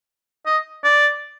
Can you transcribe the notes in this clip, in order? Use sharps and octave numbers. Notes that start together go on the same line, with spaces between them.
D#5
D5